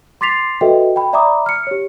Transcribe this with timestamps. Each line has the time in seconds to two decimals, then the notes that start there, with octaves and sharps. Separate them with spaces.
0.21 C6 D6 A6 B6 C7 F7
0.61 F#4 A4 B4 D#5 E5 G5
0.96 G5 B5
1.13 D5 E5 A#5 B5 D6 D#6
1.46 F6 C#7
1.67 G4 C#5